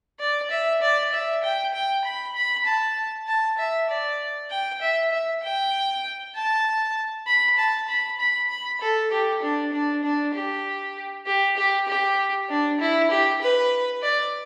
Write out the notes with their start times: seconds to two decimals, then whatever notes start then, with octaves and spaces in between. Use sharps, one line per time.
0.20 D5
0.50 E5
0.81 D5
1.12 E5
1.43 G5
1.73 G5
2.04 B5
2.35 B5
2.66 A5
3.27 A5
3.57 E5
3.89 D5
4.50 G5
4.81 E5
5.11 E5
5.42 G5
6.35 A5
7.27 B5
7.58 A5
7.88 B5
8.19 B5
8.50 B5
8.80 A4
9.11 G4
9.42 D4
9.73 D4
10.03 D4
10.34 G4
11.26 G4
11.57 G4
11.88 G4
12.49 D4
12.80 E4
13.10 G4
13.41 B4
14.02 D5